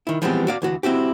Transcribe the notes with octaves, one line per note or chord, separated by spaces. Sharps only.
D#3 E4
E3 F3 G3 G#3 B3 C4
F#4 D5 F5
D2 E3 F#4
C4 E4 F#4 G4